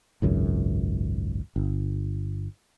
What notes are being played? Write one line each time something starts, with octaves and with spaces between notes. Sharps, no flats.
G#1 C#2 F#2
G1